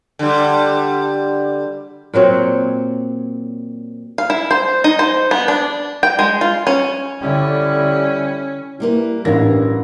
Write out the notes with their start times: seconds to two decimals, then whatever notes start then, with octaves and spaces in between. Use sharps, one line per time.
0.19 D3 G3
2.14 A#2 F#3 C4 C#5
4.18 F5
4.30 E4
4.51 C5
4.84 D#4
4.99 C5
5.31 B3
5.48 D4
6.03 G5
6.19 G#3
6.41 F4
6.67 C#4
7.21 D3 G3 C#4 E4
8.80 G3 A#3 E4 B4
9.25 A1 G2 E3 A#4 F5 A#6